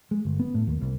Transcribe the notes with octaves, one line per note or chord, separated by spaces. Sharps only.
G#3
G1
B3
A2
D#2
C2